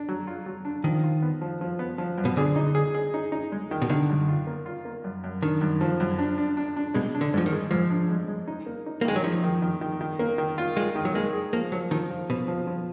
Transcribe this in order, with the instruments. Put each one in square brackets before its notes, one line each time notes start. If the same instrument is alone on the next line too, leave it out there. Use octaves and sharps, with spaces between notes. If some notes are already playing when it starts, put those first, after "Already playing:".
Already playing: [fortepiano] D4
F#3
F4
F#3
D4
[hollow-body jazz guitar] D#3 [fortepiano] F3
[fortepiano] F4
B3
F3
F3
B3
F3
F#2
[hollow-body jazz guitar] B2
[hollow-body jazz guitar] D3 [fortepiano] G#4
[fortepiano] D#4
G#4
G#4
D#4
D#4
G#3
D#3
[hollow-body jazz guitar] B2
[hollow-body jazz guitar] D3 [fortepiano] D#3
[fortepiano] F#2
F4
A#3
F4
A#3
F#2
F#2
[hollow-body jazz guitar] D#3 [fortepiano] D4
[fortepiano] F#2
F3
F#2
D4
D4
D4
D4
[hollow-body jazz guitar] B2 [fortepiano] G#3
[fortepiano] D4
[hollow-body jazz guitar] D3
[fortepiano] G#2 [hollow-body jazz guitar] F3
[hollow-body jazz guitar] D#3
[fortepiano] G#3
[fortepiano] G#2 [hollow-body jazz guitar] F3
[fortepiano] D4
G#3
G#3
D#4
A#3
D#4
[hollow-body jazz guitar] A#3
[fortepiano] D#3 [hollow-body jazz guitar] G#3
[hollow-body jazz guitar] F#3
[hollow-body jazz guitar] F3 [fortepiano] D#4
[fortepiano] D#3
D#3
D#3
D#3
A#3
D#3
F4
[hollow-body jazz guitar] G#3 [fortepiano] F4
[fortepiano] D#3
[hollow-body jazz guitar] F#3
[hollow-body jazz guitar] G#3 [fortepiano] A#3
[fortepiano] G#4
[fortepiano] F3 [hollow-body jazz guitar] A#3
[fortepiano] F3 [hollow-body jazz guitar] F#3
[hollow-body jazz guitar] D#3 [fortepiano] F3
[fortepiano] F3
[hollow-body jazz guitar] B2 [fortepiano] F3
[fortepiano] F3
F3